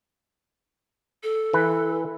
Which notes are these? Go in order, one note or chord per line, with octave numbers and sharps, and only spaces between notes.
A4
E3 B4